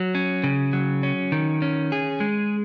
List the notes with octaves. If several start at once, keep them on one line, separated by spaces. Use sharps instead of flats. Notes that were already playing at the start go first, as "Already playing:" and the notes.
Already playing: F#3
C#4
C#3
F#3
C#4
D#3
C#4
G#4
G#3